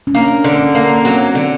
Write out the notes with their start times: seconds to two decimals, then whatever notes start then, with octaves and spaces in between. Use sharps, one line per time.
0.07 C#4
0.14 A#3 D4
0.44 D3
0.59 C#4
0.75 A#3
1.05 F#3 C4
1.35 D3